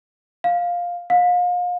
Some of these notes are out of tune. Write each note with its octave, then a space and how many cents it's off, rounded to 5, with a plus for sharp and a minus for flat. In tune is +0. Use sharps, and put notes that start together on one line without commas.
F5 +10
F5 +35